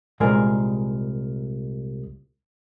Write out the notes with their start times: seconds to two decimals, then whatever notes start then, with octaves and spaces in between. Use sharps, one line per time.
0.20 C2 A#2 G#3 G#4 A#4 G#5